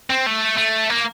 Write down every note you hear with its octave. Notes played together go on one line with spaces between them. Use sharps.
C4
A3
A3
A#3